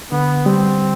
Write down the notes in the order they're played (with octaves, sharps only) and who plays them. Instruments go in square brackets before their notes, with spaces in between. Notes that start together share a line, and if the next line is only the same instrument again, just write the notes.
[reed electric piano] D3 [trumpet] B3
[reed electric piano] G3 [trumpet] C4